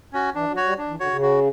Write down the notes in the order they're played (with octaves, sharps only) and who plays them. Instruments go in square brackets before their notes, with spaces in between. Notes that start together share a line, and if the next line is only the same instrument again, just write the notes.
[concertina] C#4 F#4
[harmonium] E3 [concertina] D4
[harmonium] F#3
[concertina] F#4 C#5
[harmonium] G3
[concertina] D4
[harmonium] E3
[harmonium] D3 [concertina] F#4 C#5
[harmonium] C#3
[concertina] F#4